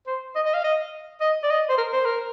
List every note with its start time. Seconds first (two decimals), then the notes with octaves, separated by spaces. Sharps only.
0.07 C5
0.35 D#5
0.45 D#5
0.54 F5
0.64 D#5
1.21 D#5
1.43 D5
1.50 D#5
1.69 C5
1.78 A#4
1.92 C5
2.05 A#4